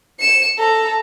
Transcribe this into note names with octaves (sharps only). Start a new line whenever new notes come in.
C#7 E7
A4 A#5